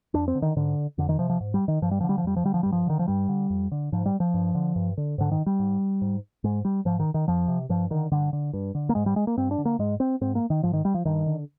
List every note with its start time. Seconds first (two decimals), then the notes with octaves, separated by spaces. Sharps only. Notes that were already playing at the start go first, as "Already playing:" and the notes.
0.14 F2 D4
0.28 C4
0.35 D3
0.42 D#3
0.56 G#2 D3
0.98 F2 D3
1.09 D#3
1.19 C3 F3
1.30 F3
1.40 G#2
1.54 G3
1.68 D#3
1.82 G2 F3
1.91 G3
2.01 D3 F3
2.09 G3
2.18 F3
2.24 F2 G3
2.36 F3
2.45 D3 G3
2.54 F3
2.63 G2 G3
2.72 F3
2.87 D3 D#3
2.99 F3
3.08 G2 G3
3.29 D3
3.50 F2
3.72 D3
3.92 G#2 F3
4.06 G3
4.20 F3
4.34 G2
4.55 D3
4.76 G2
4.97 D3
5.18 G#2 D3
5.31 D#3
5.46 G3
5.59 G#2
6.01 G#2
6.44 G#2 G#3
6.65 G3
6.85 G#2 F3
7.00 D#3
7.14 D#3
7.28 F2 F3
7.48 C3
7.69 G2 F3
7.90 D3 D#3
8.12 G2 D3
8.33 D3
8.53 G2
8.75 D3
8.89 A#3
8.95 G#2 G#3
9.06 G3
9.16 G#3
9.27 A#3
9.37 G2 C4
9.51 D4
9.58 D3
9.65 A#3
9.79 G#2 G#3
10.00 C4
10.21 G#2 C4
10.35 A#3
10.50 D#3
10.63 G#2 F3
10.73 D#3
10.85 G3
10.94 F3
11.05 G2 D#3
11.26 D3